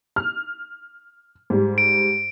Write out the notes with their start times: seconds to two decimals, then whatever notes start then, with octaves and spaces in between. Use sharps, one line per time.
0.16 F6
1.50 G#2 G3
1.78 D7